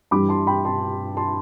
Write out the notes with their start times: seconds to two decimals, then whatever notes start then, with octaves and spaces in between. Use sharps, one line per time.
0.11 G2 E3 G3 B5 D6
0.29 A5 C6
0.47 G5 B5
0.65 A5 C6
1.17 A5 C6